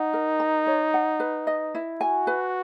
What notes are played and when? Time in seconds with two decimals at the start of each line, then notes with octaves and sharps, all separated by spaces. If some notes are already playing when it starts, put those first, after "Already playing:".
Already playing: D#4 F#5
0.13 A#4
0.40 A#5
0.67 C#5
0.94 F#5
1.20 B4
1.47 D#5
1.75 E4
2.01 F#4 G#5
2.27 B4